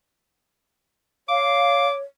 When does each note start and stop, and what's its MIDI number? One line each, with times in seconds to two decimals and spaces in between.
1.29 2.01 73
1.29 1.87 77
1.29 1.94 86